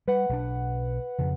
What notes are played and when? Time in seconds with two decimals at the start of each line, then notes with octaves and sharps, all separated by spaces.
0.08 G3 B4 F#5
0.29 B1 D#3 D4
1.19 F2 C#3